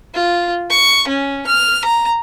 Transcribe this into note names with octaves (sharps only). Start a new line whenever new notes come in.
F4
C#6
C#4
F6
A#5